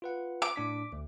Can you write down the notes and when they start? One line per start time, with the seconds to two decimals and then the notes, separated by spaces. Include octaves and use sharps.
0.02 F4 B4 F#5
0.42 D6
0.56 A2 D4 B6
0.93 D2